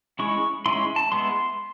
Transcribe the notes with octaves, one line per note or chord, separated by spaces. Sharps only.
G#3 C#4 E4 C#6
G#3 C#4 E4 C6
A5
G#3 B3 E4 C6